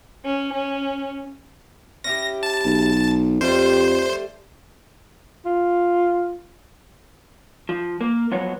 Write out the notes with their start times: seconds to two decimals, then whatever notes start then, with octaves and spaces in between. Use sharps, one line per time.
0.23 C#4
0.53 C#4
2.04 C#4 E4 G4 A#6
2.43 A5
2.65 B1
3.41 F2 G3 A3 G4 C5
5.46 F4
7.69 F3
8.01 A#3
8.31 F3 F#3 B3 C#5